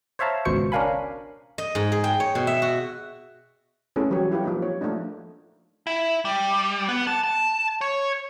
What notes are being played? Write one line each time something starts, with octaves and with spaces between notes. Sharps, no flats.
C5 C#5 E5 F5 A5 A#5
G#1 C#2 B2 C5 C#6 C#7
C#4 D4 A#4 F5 G#5 B5
D#5
G#2
G#4
G5
C#5
B2
E5
F#4
A3 C#4 E4 G#4 A4 B4
E3 F#3 G3 G4 C#5
E4 F4 G4 B4
F3 A#3 D#4
C#5
F3 A3 A#3 D4 D#4
E4
G3
B3
A5
A5
C#5